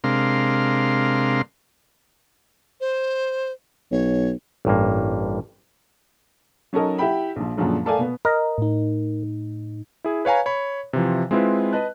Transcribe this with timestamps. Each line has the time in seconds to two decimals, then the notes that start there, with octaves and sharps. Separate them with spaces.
0.04 C3 G#3 D4 A#4 F5 C6
2.80 C5
3.91 B1 C#5
4.65 A1 G2 A#3
6.73 F#3 C#4 D#4 A4 A#4 D#5
6.98 E4 G4 E5 F#5 G5 B5
7.36 A#1 F3
7.56 F#2 A#2 D3 F3 F#3 G#3
7.85 A3 A4 A#4 D5 F5 G#5
7.98 B2 B3
8.25 A#4 D#5
8.58 A2 D#4
10.04 E4 G#4
10.25 B4 C#5 F5 G#5 A#5
10.46 C#5 B5
10.93 C3 E3 F3
11.31 G#3 C4 E4 F4 B4
11.73 B4 D#5 A5 F#6